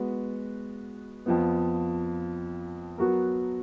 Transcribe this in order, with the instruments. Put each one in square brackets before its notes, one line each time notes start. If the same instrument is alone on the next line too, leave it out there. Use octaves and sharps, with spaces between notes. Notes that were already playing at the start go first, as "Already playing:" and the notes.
Already playing: [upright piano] G#3 B3 F#4 B4
F2 F3 B3
F#3 B3 F#4 A#4